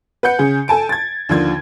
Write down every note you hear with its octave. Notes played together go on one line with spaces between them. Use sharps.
B4 F#5 G6 C#7
C#3 G#4
A4 G#5 A5 D7
G#6 A6
D#2 D3 F3 G#6